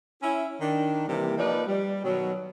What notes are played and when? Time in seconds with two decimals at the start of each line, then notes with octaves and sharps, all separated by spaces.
0.21 C#4 E4
0.59 D#3 D4
1.07 C3 E3 G3 A#3
1.37 F3 A#3 D#4 B4 D5
1.66 G3
2.03 B2 D#3 F#3